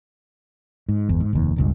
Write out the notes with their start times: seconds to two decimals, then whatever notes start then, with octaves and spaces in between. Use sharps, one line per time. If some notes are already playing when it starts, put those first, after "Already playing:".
0.89 G#2
1.09 G1 E2
1.20 G#2
1.33 F1 D#2
1.56 E1 C#2 G2